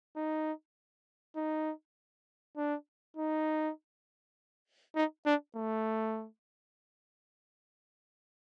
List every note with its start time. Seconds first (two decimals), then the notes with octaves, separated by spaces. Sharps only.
0.16 D#4
1.36 D#4
2.57 D4
3.17 D#4
4.96 D#4
5.26 D4
5.56 A3